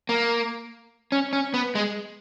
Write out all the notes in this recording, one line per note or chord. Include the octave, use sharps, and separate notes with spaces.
A#3
C#4
C#4
B3
G#3